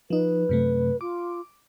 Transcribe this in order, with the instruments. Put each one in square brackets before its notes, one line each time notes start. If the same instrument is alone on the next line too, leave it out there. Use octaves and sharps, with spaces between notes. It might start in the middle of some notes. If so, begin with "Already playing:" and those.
[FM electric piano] F3 D#4 [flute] B4
[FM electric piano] F#2 C3 A3
[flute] F4 [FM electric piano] D6